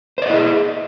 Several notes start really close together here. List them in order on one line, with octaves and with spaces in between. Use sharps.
C5 D5 D#5 E4 G#4